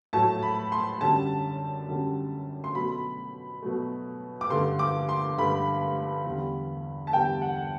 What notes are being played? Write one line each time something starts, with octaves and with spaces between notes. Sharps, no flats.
A2 F#3 A3 A5
B5
C6
F#2 D3 G3 A5
F#2 D3 G3
C6
B2 F#3 A3 B5
B2 F#3 A3
D6
G2 D3 A3 C6
D6
C6
G2 D3 A3 B5
E2 D3 G3
A5
E2 D3 G3 G5
F#5